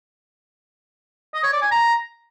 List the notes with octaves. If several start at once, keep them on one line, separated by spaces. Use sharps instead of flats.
D#5
C#5
D5
G#5
A#5